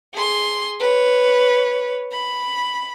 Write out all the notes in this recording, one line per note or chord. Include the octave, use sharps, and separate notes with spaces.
G#4 C6
B4 C#5
B5